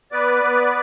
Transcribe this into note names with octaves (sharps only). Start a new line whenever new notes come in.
B3 B4 D5
B3